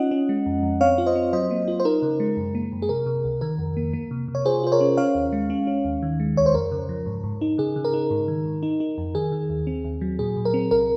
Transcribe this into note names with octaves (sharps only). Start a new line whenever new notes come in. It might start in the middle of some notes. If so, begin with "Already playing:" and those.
Already playing: C#4 D#4 F4 D#5 F#5
C#4
G#3
F2
F2
C4 C#5 F5
F4
C5 D#5
C4
F#3 C5 D#5
A#3
F4
C5
D#4 A#4
C#3
G#3
F#2
A#3
F#2
G#4
C3 A#4
C3
C#2
D#3 A#4
F2
A#3
A#3
C3
C3
C#5
F4 G#4 C5
F4 C5
A#4 C#5
C#4
C#4 C#5 F5
D#2
G#3
C#4
C#4
D#2
D#3
G#3
C#2 C#5
C5
F2 A#4
C#3
F3
G#2
G#2
D#4
C#3 G#4
C#3
A#4
D#4
G#2
D#3
G#2
D#4
D#4
F2
D#3 G#4
D#3
D#2
C4
D#2
F#3
A#2 G#4
A#2
A#4
C4
C2 A#4